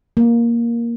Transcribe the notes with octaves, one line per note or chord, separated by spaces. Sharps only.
A#3